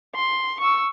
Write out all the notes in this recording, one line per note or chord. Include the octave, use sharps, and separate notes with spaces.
C6
C#6 E6